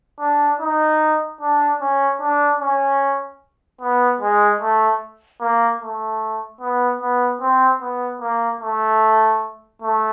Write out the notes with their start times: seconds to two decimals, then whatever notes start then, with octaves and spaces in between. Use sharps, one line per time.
0.20 D4
0.60 D#4
1.41 D4
1.81 C#4
2.21 D4
2.61 C#4
3.81 B3
4.21 G#3
4.61 A3
5.41 A#3
5.81 A3
6.61 B3
7.02 B3
7.41 C4
7.81 B3
8.21 A#3
8.61 A3
9.82 A3